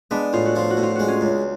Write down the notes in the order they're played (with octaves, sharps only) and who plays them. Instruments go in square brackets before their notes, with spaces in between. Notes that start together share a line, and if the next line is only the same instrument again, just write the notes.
[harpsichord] G#3 [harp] B3 D4
[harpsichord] A2 [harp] F4
[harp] F#4
[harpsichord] F3 [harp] F4
[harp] F#4
[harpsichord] A2
[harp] F4
[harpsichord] G#3 [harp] F#4
[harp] C#4 F4
[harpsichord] C#2